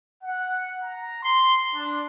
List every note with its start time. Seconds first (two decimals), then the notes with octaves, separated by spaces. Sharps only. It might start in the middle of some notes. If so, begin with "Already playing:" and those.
0.23 F#5
0.83 A#5
1.22 C6
1.75 D4